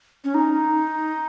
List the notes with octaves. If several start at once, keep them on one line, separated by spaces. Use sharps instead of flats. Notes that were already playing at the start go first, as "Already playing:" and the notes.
C#4
D#4